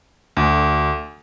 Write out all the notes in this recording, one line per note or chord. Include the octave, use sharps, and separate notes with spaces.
D2